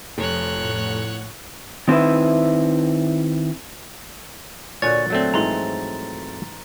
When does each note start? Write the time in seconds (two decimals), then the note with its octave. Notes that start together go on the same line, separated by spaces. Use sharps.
0.18 F1 F3 C#5 C6 F#6
0.56 A2 F#5 C#6
1.88 D#3 C4 E4 B4 E5
4.82 A#2 D3 F#4 C#5 G#5 A6
5.10 F#3 A3 C4
5.34 G#2 E3 F3 A#5 C6